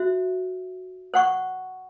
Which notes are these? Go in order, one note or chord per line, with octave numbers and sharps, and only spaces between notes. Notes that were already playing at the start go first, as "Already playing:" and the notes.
Already playing: F#4 C5 E5
C5 F#5 C#6